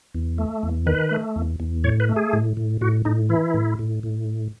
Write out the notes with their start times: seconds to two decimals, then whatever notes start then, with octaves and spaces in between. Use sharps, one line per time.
0.15 E2
0.38 A3
0.63 E2
0.86 D#3 B4
1.11 A3
1.36 E2
1.60 E2
1.84 A2 C#5
2.00 B4
2.09 A3
2.16 G#4
2.33 A2
2.57 A2
2.81 A2 F#4
3.05 A2 D#4
3.29 E3 E4
3.54 A2
3.79 A2
4.03 A2